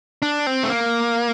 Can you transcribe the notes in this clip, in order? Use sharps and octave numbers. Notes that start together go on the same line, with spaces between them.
D4
C4
A3
A#3